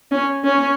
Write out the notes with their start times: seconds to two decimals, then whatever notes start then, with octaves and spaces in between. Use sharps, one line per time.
0.12 C#4
0.44 C#4